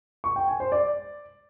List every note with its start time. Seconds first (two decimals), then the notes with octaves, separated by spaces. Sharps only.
0.24 C#6
0.36 G5
0.48 G#5
0.60 C5
0.72 D5